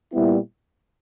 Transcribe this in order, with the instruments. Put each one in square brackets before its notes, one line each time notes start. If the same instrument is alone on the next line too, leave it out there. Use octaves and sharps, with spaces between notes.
[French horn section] A#2 G3 B3 E4